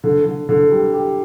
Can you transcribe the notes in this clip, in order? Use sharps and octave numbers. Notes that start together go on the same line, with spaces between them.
D3
D3
D3
G3
G4